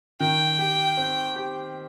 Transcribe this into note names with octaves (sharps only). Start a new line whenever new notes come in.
D#3 G5
G4
C4
G4